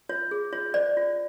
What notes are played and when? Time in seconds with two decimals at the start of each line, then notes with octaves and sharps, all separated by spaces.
0.09 F4 C#5
0.31 G#4
0.52 F4 C#5
0.74 C5 D5
0.97 F4